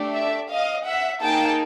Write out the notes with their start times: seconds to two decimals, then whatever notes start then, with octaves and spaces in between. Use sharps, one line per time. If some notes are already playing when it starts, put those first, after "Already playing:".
Already playing: A3 D4 G4
0.15 D5 E5
0.51 D#5 F5
0.86 E5 F#5
1.22 A#3 D#4 G#4 G5 A5